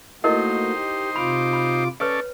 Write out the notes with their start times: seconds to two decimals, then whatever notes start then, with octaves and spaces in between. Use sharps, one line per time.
0.24 A3 A#3 D#4 E4 F#4 A#4 C5 D#5
0.74 G4
1.16 C3 F4 B5 D6
1.53 B5
2.00 C#4 A4 B4 C#5 D5